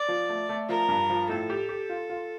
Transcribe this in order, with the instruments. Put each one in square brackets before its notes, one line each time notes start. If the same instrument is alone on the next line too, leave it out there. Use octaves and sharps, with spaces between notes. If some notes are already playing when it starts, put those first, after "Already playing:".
Already playing: [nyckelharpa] D5
[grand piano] F3
A3
A3
[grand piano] F3 [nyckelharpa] A#4
[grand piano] G2
F3
[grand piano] A2 [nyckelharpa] A4
[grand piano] G4
G4
F4
F4